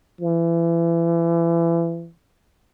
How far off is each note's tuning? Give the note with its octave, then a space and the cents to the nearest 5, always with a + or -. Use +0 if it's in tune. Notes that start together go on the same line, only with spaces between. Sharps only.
E3 +30